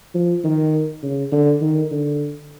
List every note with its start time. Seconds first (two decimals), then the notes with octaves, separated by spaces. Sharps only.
0.15 F3
0.44 D#3
1.03 C#3
1.32 D3
1.61 D#3
1.91 D3